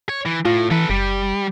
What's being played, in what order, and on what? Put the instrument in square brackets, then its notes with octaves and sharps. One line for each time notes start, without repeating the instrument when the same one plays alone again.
[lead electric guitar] C#5
E3
[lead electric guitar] A2 [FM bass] F4
[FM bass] E3 [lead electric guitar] A4 B4
[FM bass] F#1 [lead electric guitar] G3